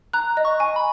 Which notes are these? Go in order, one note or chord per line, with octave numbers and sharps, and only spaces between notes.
A#5 F#6
D#5
C#6
G#5
B5